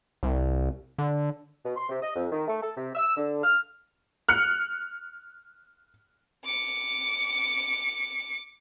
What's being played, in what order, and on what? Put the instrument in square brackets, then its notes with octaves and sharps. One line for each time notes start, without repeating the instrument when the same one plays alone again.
[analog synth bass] C2
D3
[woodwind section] B2
C6
C3
D#5
F2
D#3
A3
A4
C3
E6
D3
F6
[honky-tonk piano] F6 F#6 C#7
[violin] D6 C#7